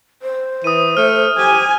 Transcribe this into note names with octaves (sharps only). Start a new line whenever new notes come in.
C5
E3 D#6 D#7
A3 F6
G4 G#5